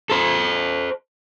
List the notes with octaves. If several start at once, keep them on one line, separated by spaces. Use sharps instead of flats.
A4 C5